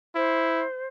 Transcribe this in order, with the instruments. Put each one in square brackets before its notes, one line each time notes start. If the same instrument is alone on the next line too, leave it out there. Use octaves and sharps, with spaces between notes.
[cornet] E4 [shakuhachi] C5